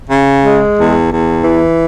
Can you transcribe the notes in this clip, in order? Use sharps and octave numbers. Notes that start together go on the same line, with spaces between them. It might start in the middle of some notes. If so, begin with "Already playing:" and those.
C#3
G#3
E2
E2
E3